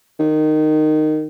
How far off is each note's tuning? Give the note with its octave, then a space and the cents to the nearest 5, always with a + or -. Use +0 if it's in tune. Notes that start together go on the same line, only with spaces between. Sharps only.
D#3 -15